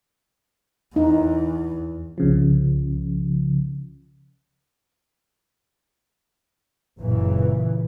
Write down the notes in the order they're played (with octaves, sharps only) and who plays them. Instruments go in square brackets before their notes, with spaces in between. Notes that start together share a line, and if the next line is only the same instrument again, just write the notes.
[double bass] E2 [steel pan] D#4
[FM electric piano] C2 C#3 F3
[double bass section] F#1 A#2 C#3 E3